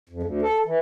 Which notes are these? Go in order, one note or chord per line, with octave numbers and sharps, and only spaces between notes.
F2
D2
A4
E3